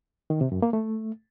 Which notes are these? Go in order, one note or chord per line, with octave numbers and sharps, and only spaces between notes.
D#3
C3
F#2
A#3
A3